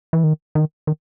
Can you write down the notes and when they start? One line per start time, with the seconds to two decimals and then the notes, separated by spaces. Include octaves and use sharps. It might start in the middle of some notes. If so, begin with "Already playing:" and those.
0.13 E3
0.24 D#3
0.55 D#3
0.87 D#3